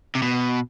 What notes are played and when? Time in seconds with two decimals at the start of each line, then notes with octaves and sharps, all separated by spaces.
0.15 C3
0.22 B2